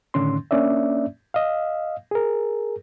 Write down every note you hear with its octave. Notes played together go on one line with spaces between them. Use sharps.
A2 D3 D#3 C#4 C6
A#3 C#4 D4 D5 E5
D#5 F5
G#4 A#4